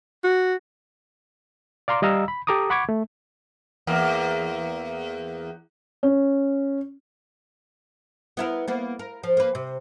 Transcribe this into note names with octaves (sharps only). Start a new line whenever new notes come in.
F#4
D5 F5 A#5 C6 D6
G3 D#5 F5 A#5 E6
B5
G4 A4 A#5 D6 D#6
F#5 B5 C#6 D6 G#6
A3
E2 A#3
C#4
B3 E4 A#4
A#3 B3
A#4
F3
A#3 B4
C3